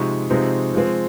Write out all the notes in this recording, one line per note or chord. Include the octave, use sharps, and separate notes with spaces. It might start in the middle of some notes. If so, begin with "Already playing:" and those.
Already playing: C3 F3 G#3 D#4 C#6
C3 F3 G#3 C4 D#4
F3 G#3 C4